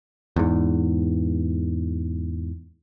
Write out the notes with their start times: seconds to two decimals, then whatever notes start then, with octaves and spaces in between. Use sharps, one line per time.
0.36 E2 G#2